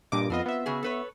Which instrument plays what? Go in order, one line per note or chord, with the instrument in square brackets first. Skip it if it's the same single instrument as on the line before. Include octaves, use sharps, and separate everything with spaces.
[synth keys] G2 A#2 D6 [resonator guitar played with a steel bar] D#5
[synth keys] F2 B3 D#5 [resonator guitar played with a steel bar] C4 F4
[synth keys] B3 E5
[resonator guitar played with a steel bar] C#3 F#4 G#4
A4 B4 C#5